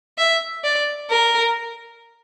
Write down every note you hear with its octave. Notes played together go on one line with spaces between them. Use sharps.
E5
D5
A#4